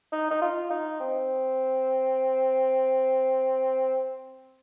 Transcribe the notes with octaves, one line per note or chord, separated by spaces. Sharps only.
D#4
D#4
F4
D#4
C4